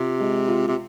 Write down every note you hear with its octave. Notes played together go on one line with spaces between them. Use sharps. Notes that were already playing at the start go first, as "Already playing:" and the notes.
Already playing: C3 F4
G#3
F4
C3